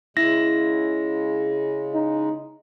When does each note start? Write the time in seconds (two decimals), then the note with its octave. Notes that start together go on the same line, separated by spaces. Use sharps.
0.17 C#3 G#3 E4 A#6
1.94 D#4